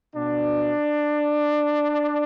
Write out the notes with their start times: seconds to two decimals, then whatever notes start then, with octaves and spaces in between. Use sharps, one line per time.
0.16 B2 D4